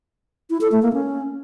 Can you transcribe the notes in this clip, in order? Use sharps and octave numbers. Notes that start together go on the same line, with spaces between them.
E4
A4
A3
A#3
C#4